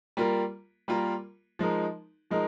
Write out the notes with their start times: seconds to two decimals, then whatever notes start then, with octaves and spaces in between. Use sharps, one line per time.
0.17 G3 A#3 F4 A#4
0.88 G3 A#3 F4 A#4
1.59 F3 G#3 D#4 A#4
2.31 F3 G#3 D#4 A#4